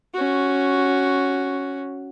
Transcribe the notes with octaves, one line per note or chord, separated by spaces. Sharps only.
C#4 F#4